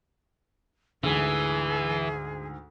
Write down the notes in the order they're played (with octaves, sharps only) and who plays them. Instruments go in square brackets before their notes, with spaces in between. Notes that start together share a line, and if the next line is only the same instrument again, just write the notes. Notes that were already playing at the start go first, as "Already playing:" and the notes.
[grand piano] D2 G#2 [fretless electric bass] D3 [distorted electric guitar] E3 [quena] G#4